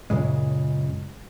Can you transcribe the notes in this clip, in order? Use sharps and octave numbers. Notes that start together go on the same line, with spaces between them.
F#2 A#2 C#3 G#3